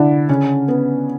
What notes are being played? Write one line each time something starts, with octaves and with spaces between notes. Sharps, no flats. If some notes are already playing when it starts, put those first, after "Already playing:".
Already playing: D3 D4 E4
C#3 C#4
B3